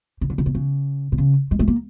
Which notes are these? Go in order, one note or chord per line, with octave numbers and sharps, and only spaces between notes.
C#3
D3
C#3
B2
C#3
C3
C#3
G#3
A3
A#3